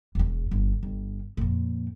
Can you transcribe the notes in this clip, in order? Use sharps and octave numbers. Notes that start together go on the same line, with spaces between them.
E1 E2
G1
G1
F2 A#2